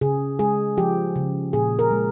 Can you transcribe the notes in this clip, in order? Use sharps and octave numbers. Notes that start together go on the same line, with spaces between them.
C#3 G#4
G#3 G#4
F3 G4
C#3
A#2 G#4
A#4
G#3